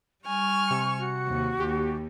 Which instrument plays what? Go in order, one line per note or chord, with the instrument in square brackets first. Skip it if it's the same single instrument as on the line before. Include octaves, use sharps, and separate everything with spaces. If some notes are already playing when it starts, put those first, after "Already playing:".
[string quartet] G3 G#5 F6 [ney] C#6
[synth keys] C3 C#7
[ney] F#4
[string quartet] D#2
[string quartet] D#2 [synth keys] G4